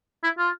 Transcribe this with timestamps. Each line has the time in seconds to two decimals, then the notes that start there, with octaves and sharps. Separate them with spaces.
0.23 E4
0.38 F4